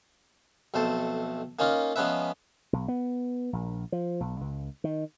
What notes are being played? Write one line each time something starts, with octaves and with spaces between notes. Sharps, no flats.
B1 F2 A3 C5 A5
A#3 C#4 D#4 F4
F3 G#3 B3 C#4 B4 E5
B1
B3
A#1
F3
B1
C#2
D#3